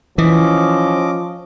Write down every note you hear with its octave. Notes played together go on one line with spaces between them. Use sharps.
E3 F3 C#4 D#5 D6